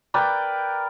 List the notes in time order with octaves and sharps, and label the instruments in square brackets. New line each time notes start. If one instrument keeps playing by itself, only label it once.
[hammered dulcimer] A#4 B4 D5 G5